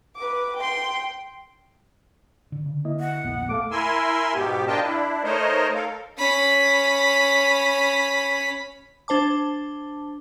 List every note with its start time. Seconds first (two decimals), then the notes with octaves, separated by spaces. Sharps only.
0.16 B4 D6
0.57 G5 C6
2.52 D3
2.66 C#3
2.85 A#3 E4 D#5
3.00 F#5
3.24 E1 A#1 B3
3.49 A3 A4 F5 D6
3.71 E4 A#4 G#5 C6 E6
4.34 G#2 B2 B3 G4
4.67 D4 F4 A#4 D#5 G5 A5
4.83 D4 E4
5.24 A3 D#4 A#4 C5 C#5 D#5
5.75 A4 A#4 F5
6.18 C#4 B5
9.08 D4 C5 A5 D6